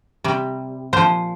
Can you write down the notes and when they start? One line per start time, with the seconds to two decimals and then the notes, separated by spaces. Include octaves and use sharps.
0.24 C3 G3
0.93 A#2 F3 C5